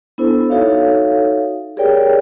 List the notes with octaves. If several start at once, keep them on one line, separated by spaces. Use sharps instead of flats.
B3 D4 E4 A4 C5
D#4 F#4 A4 C#5 E5 F5
G4 G#4 A#4 C#5 D5 G5